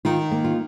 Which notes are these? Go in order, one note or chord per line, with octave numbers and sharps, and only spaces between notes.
D#3 F4
A#3
F4